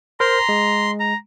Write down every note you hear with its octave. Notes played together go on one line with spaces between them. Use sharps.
A#4 C5 A#5 C6
G#3
A#5